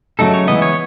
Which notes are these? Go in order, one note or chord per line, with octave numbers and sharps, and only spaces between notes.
C#3 F#3 A3 D#4 A4
C#5
E3 G#3 B3 D#5
C#5